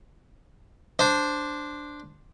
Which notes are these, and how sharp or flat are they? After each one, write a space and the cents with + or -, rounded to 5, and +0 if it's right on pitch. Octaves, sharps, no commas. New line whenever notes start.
D4 +0 C5 +0